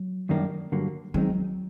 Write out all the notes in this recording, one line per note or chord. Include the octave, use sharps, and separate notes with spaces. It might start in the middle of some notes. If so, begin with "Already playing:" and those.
Already playing: F#3
F#2 D#3 G3 A#3 D4
G2 D3 F#3 A#3
D#3 F#3 G#3 C4 D#4